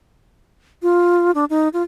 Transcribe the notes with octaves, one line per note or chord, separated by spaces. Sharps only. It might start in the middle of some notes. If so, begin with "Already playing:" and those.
F4
D4
D#4
F4